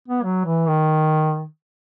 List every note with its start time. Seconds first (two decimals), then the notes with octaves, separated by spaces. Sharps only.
0.08 B3
0.23 F#3
0.45 E3
0.68 D#3